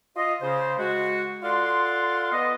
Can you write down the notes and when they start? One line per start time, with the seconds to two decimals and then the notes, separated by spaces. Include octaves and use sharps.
0.16 F4 D#5
0.42 C#3 C5
0.78 G#3 F#4
1.43 F4 A4 D5 F5 F#5 C6
2.32 B3 D#5